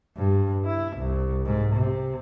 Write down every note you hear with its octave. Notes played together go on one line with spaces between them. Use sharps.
G2
E4
C2
G#2
C3